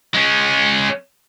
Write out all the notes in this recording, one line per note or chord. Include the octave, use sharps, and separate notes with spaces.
G#3 C#4